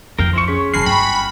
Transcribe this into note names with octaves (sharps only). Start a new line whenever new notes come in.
F2 A#4 F5 G5
F3 E4 C6 C#6
C#4 G#4 C#5 B6
E1 F#2 F#4 G#5 A5 B5 F6 C7
G1 G5 B5 C#6